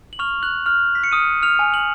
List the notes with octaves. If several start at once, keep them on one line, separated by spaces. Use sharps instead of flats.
F#7
C#6 F6 F7
F#6 F#7
F6 F7
B6
C#7
D#6 F6 D#7
F6 F7
G#5
F#7